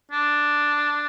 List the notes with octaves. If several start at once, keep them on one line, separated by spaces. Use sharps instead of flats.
D4